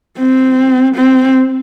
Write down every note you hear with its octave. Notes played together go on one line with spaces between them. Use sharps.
C4
C4